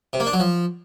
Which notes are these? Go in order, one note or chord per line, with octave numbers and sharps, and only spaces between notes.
C3
A#3
D4
F#3
F3